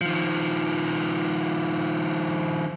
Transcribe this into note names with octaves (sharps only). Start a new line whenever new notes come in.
D#3 F3